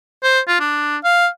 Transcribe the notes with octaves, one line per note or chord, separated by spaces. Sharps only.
C5
F4
D4
F5